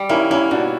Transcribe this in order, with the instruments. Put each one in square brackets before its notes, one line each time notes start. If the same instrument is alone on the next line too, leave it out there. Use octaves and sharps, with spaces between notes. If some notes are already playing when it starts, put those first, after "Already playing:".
Already playing: [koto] G3
[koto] A#3 [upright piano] C#4 E4
[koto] A#3 [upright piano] C#4 E4
[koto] B2 [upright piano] D4 F#4